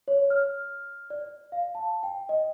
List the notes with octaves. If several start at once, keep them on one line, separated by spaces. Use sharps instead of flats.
C#5
F6
D5
F5
A5
G5
D#5